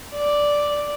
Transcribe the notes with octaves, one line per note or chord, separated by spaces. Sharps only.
D5